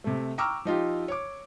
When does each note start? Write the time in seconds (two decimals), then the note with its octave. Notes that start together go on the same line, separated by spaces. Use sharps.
0.04 C3 A3
0.38 G5 A#5 C#6 D6 E6 F6
0.65 F3 D#4 F4 G4
1.08 C#5 D6